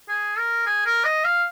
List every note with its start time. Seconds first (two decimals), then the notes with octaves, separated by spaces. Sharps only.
0.09 G#4
0.38 A#4
0.66 G#4
0.86 A#4
1.05 D#5
1.25 F5